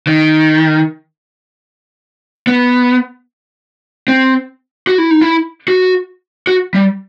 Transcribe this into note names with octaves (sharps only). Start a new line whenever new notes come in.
D#3
B3
C4
F#4
E4
D#4
E4
F#4
F#4
G3